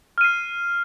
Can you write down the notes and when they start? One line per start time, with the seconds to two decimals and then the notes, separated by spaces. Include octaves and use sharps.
0.18 F6
0.21 D#7
0.24 C7